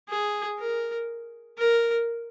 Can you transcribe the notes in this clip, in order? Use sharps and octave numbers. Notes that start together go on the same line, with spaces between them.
G#4
A#4
A#4